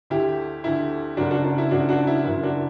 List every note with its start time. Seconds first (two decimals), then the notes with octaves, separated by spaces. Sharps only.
0.10 D2 D3 E4 G4
0.64 D2 D3 E4
1.17 F#1 F#2 C#3 D4 F#4
1.31 D4 F#4
1.44 D4
1.58 E4
1.71 F#1 F#2 C#3 D4 F#4
1.89 D4 F#4
2.07 E4
2.24 F#1 F#2 E3 E4
2.43 D4 F#4